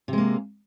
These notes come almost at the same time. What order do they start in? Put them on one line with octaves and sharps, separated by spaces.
C3 G#3 A#3